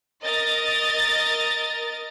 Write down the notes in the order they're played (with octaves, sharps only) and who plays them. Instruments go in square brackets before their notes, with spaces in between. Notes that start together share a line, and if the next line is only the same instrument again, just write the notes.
[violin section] A#4 D#5 A6